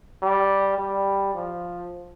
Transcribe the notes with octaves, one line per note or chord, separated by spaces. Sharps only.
G3
G3
F3